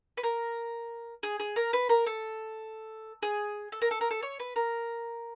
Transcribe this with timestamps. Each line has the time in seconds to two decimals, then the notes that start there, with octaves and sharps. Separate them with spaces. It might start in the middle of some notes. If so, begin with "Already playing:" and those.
0.17 B4
0.23 A#4
1.23 G#4
1.39 G#4
1.56 A#4
1.73 B4
1.89 A#4
2.06 A4
3.22 G#4
3.72 A4
3.82 A#4
3.91 A4
4.01 A#4
4.11 A4
4.22 C#5
4.40 B4
4.56 A#4